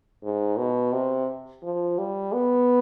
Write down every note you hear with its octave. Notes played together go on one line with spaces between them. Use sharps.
G#2
B2
C3
F3
G3
B3